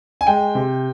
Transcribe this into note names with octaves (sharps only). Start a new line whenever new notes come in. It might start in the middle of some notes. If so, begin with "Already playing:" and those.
G#5
G#3 G5
C3